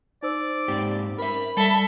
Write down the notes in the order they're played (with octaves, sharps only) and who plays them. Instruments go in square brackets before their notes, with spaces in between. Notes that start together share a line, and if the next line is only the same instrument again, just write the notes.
[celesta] D#4 C5 E6 [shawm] D5
[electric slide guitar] G#2 C4 G4
[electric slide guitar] A#4 E5 [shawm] B5
[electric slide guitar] G3 [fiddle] A4 E5 [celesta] A5